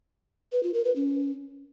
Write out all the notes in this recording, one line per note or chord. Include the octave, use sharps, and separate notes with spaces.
B4
F4
A#4
B4
C#4